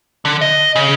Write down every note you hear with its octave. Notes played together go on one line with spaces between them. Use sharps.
D3
D#5
C#3